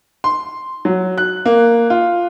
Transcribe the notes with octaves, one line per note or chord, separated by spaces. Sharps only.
C6
F#3
F#6
A#3
F4